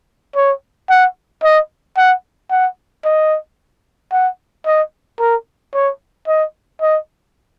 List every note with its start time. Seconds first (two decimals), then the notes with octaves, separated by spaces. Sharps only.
0.36 C#5
0.89 F#5
1.43 D#5
1.97 F#5
2.50 F#5
3.05 D#5
4.12 F#5
4.66 D#5
5.19 A#4
5.74 C#5
6.27 D#5
6.81 D#5